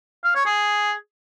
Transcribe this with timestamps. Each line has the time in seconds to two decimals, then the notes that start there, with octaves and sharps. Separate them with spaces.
0.24 F5
0.35 C#5
0.46 G#4